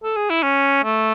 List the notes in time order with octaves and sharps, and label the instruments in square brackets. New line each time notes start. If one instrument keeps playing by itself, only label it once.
[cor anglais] A4
G#4
E4
C#4
A3